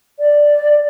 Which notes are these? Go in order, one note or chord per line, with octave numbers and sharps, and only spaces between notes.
D5